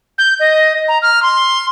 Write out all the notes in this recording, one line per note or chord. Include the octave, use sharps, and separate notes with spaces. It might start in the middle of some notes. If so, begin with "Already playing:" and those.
G6
D#5
A#5
F6
C6